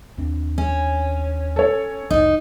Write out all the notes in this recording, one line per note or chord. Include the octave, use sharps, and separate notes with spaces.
D#2 C4 D4
C#4
A4 C#5
F1 C2 D#4